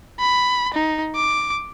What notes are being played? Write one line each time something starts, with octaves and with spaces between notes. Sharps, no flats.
B5
D#4
D6